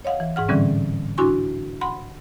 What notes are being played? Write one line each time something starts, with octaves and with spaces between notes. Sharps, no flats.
C#5 D#5 F5 F#5
E3
G#2 G#4 F#5 F6
A2 D3 E3 G3 C4 C#4
D4 E4 F#4 G#5 C6 C#6
F#5 B5 C6